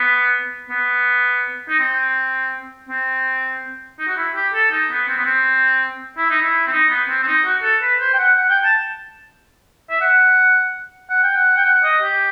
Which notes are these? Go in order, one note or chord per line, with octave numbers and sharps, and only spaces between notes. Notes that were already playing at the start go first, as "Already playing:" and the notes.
Already playing: B3
B3
D#4
C4
C4
D#4
F#4
E4
G4
A4
D#4
B3
C4
B3
C4
E4
D#4
E4
C4
D#4
B3
C4
C4
D#4
F#4
A4
B4
C5
G5
F#5
F#5
G5
A5
E5
F#5
F#5
G5
F#5
G5
F#5
D#5
G4